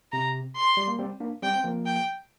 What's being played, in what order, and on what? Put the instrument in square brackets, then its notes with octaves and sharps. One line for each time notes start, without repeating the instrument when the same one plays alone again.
[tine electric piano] C3 [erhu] A#5
[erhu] C6
[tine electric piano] G3
A#3
G3 C4
A#3 D4
[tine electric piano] G3 C4 [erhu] G5
[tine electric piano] C4
F3 A#3
[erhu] G5